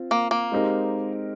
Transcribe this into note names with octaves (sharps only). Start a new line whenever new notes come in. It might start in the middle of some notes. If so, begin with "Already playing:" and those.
Already playing: C4 F4
A#3
A#3
G#3 C4 D#4 G4 A#4